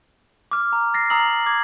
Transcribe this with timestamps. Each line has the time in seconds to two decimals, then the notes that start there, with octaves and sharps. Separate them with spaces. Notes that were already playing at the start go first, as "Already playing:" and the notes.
0.51 D6 F6
0.73 A#5
0.94 A6 A#6 C7
1.10 A#5 D#6 E6 F#7
1.46 D6 G#6